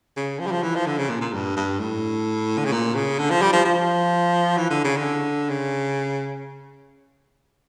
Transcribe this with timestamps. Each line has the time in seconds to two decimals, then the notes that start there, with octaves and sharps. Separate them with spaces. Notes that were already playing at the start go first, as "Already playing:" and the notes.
0.16 C#3
0.39 F3
0.47 G3
0.52 F3
0.62 E3
0.75 F3
0.86 D3
0.98 C#3
1.10 A#2
1.21 A#2
1.33 G2
1.56 G2
1.79 A2
2.58 D3
2.65 C#3
2.72 A#2
2.95 C#3
3.19 D3
3.30 F3
3.42 G3
3.53 F3
3.65 F3
4.57 E3
4.70 D3
4.84 C#3
4.97 D3
5.50 C#3